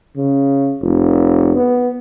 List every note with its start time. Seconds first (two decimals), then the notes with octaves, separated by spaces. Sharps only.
0.17 C#3
0.82 F1
1.56 B3